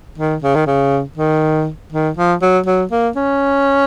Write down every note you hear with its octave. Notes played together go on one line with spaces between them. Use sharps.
D#3
C#3
D#3
C#3
D#3
D#3
F3
F#3
F#3
A#3
C#4